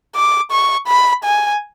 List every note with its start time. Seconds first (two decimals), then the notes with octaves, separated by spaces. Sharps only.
0.15 D6
0.52 C#6
0.88 B5
1.24 G#5